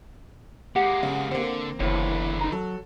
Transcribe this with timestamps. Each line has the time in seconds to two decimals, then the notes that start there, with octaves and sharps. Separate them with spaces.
0.76 G#3 A#3 G4 F#5
1.03 C#3
1.31 D3 A#3 C4
1.80 F#1 E2 D3 E4 B4 C#5
2.41 D#4 A#5
2.52 F#3 A4